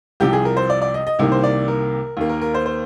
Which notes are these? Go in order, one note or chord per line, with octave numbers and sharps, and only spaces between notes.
C2 C3 F3 G4
G#4
A#4
C5
D5
D5
D#5
D#5
C2 C3 D#3 A#3
C5
D5
A#4
D#2 D#3 A#3
A#4
A#4
C5
C5